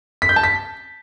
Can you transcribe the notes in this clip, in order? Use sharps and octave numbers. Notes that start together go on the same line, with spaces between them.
B6
G6
A5
B6